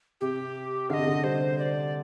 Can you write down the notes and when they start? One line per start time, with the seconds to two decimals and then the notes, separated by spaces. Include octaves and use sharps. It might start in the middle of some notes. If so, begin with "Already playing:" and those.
0.21 C3 G4
0.90 D3 F5
0.94 C3 D#5
1.07 D3
1.24 G3 C5
1.58 D5